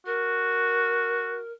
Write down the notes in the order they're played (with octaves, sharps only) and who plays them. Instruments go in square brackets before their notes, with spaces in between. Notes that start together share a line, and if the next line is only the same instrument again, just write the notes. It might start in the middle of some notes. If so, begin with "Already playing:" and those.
[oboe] F#4 [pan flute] A#4